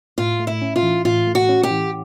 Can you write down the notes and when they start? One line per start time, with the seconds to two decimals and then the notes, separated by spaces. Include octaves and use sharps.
0.18 A2 F4
0.40 A3
0.47 E4
0.62 C#4
0.76 F4
0.83 E3
1.05 A2 F4
1.27 A3
1.35 F#4
1.49 C#4
1.63 G4
1.70 E3